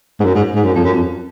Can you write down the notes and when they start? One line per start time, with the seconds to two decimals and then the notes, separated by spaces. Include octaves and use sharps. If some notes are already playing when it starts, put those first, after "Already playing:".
0.20 G#2
0.25 F#2
0.35 G#2
0.55 G#2
0.64 F#2
0.75 F2
0.84 F#2
0.94 F2